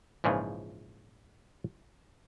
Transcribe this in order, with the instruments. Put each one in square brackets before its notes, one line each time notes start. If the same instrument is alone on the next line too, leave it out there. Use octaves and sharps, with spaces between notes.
[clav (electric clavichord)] A#1 G#2 C#3 E3 F3